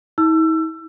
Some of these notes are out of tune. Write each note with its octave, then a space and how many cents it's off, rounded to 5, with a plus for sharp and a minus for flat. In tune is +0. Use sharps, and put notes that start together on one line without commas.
E4 -45 E6 +30